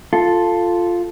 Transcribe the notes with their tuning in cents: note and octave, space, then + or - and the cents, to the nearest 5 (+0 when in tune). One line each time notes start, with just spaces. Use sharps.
F4 +0 A4 +0